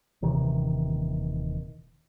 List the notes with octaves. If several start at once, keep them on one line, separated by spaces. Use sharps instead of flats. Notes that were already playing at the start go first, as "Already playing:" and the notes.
D#1 C3 D#3 E3